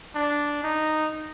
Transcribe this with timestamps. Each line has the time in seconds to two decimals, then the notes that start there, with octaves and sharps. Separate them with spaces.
0.15 D4
0.64 D#4